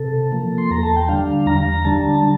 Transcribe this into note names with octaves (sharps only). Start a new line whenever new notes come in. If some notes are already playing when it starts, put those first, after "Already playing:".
Already playing: C3 A4
F3 A#3
C6
E2 A#5
A5
G5
D3 G3 D4 F5
E2 A#5
D3 G3 D4 A5